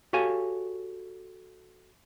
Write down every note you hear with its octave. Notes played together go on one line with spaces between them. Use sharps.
F#4 G4 A4 C#5 F5 G#5